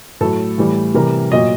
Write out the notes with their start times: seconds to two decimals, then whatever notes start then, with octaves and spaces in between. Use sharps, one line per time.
0.21 A2 F#3 A4
0.58 A2 E3 G3
0.94 C3 E3 G3 A#4
1.32 A#2 F#3 D#5